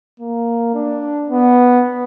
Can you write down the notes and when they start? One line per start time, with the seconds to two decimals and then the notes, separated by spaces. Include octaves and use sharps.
0.20 A#3
0.74 D4
1.30 B3